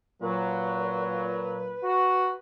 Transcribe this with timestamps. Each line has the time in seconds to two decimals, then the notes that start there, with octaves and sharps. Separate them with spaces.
0.21 A#2 F#3 B4
1.83 F#4